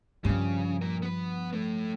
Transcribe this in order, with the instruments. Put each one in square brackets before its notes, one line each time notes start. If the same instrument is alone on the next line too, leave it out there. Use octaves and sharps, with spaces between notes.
[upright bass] G2 F3 [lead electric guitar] C#3
[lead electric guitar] A#2 A#4
B3 B4
A2 A3